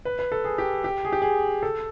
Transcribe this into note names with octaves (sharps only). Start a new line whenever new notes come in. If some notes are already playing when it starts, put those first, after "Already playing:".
B4
B4
A4
G#4
G4
G4
G#4
G4
G#4
A4